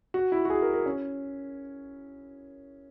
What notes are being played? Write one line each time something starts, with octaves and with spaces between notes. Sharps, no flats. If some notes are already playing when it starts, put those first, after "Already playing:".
F#4
E4
F#4
G#4
A#4
A#4
C#4